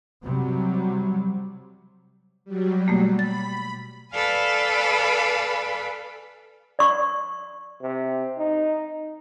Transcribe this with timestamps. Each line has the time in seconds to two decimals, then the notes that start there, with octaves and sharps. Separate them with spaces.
0.25 C3 F#3 G3
2.45 F#3 G3
2.88 B2 A3 A#3
3.19 B5 A6
4.14 A4 B4 D5 F5 G#5 B5
6.79 D5 C#6
7.82 C3
8.38 D#4